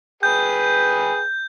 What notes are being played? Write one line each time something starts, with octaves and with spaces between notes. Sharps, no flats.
G#4 B4 G5 G6